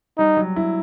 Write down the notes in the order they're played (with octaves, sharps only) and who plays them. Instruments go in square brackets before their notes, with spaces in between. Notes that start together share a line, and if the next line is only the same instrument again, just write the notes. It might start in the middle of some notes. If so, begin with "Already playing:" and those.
[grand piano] G3 [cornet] D#4
[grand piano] F#3
E4